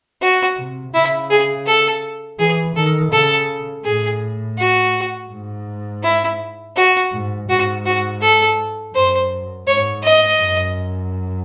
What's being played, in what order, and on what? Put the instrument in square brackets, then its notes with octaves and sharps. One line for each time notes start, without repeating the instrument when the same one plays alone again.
[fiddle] F#4
[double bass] C3
[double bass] C#3 [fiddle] E4
[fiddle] G#4
A4
[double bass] E3 [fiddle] G#4
[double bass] D#3 [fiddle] A4
[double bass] C#3 [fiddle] A4
[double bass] A2 [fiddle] G#4
[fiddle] F#4
[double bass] G#2
[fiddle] E4
F#4
[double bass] G#2
[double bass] G#2 [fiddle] F#4
[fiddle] F#4
A4
[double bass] F#2 [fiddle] C5
[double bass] G#2 [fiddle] C#5
[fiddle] D#5
[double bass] F#2